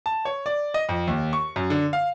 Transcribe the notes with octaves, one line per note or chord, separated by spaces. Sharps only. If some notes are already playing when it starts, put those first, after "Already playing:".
A5
C#5
D5
D#5
F2
D#2
C#6
F#2
D3
F5